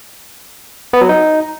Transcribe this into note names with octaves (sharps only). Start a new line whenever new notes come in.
B3
F#3
D#4